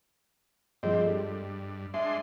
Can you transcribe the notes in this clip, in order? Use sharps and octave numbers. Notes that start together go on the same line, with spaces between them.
G2 F3 G#3 C4 D#5
G2 G3 A4
G#3 D4 E5 C6